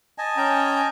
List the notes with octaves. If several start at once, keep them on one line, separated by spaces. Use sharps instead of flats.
D#5 G#5 A5
C#4 G5 A#5